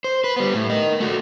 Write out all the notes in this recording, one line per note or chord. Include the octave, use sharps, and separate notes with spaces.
C5
B4
G3 B3
A2
A#4 D#5
A3 F#4